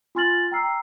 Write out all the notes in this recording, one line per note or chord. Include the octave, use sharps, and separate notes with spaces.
F4 G#5 C6 F6 A6 F#7
G5 A#5 E6 F6 C7